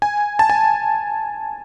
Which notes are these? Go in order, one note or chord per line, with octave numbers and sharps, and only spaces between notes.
G#5
A5
G#5